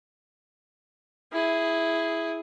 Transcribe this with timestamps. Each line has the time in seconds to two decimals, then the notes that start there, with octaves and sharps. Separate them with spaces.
1.33 E4 G#4